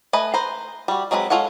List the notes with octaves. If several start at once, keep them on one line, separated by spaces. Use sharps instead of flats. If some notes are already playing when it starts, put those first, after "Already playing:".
A3 B4 D#5 G#5
B4 C5 A#5
G3 F#4
F#3 G#3 C4 A4 B4
G#3 F4 A4 C#5 F#5